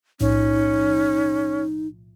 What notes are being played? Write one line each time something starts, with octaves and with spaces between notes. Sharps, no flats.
B1 A2 F3 C#4 D#4